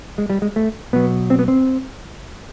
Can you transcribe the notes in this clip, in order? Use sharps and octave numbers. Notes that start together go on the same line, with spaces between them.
G#3
G3
G#3
A3
B2 F#3 B3
C4
B3
C4